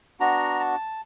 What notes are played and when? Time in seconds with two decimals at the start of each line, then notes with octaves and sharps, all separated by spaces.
0.20 B3 D4 F#4 A#5
0.60 A5